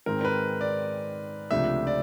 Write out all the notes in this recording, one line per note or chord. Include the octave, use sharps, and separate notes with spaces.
G#2 D#3 G#3 C4 A#4
A#4
B4
D5
C#2 C3 F3 A3 D4 E5
D5